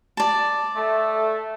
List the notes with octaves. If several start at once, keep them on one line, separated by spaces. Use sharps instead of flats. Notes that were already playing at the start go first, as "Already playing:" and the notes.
D5 A5
A3